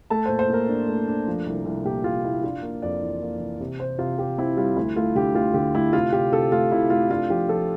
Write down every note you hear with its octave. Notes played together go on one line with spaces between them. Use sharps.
A3 A5
A#2 C5
C5
A#2 A#4
D4
A3
D4
F3
C2
C2
A#2 G4
C2 F4
A#3 E4
D4 F4
A#3
F2 D5
E3
A#3
E3
C3
C3 C5
C3 F4
C3 G4
C4 E4
G3 F4
D2 E4
A3 F4
D3 G4
D2 F4
D3 G4
A3 E4
C3 F4
C3 G4
C3 A4
A3 F4
C3 E4
A3 F4
D4 F4
F3 G4
F3 A4